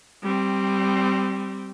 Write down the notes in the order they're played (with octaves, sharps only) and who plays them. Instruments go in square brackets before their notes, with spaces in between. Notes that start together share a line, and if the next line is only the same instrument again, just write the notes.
[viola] G3 C4